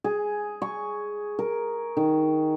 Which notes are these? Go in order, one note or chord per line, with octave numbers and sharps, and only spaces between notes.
G#4
C#6
A#4
D#3